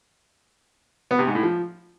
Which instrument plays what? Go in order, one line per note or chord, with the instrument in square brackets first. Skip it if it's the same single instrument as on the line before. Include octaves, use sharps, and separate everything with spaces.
[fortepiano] B3
C3
G#2
A2
F3